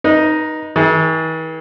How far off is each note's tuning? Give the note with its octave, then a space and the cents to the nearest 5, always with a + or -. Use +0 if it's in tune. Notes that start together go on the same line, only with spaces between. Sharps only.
D#4 +0 B4 -35
E3 -45 G#4 +30